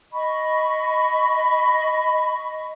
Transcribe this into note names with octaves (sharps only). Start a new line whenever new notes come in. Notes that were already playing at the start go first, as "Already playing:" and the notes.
D#5 B5 C#6